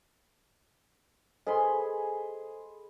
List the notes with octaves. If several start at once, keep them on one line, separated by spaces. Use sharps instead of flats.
G#4 A4 C5 D#5 B5 C6